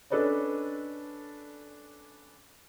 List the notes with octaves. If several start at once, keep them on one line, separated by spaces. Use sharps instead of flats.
C#4 D4 A4 B4 D5 D#5